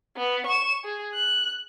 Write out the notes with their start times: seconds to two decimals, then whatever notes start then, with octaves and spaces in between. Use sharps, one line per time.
0.17 B3
0.46 C#6 E7
0.84 G#4
1.14 F#6